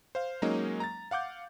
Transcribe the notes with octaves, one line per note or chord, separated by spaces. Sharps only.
C5 F5
F#3 G#3 A#3 C#4 D#4
A#5 A6
F5 F#5 D6 G6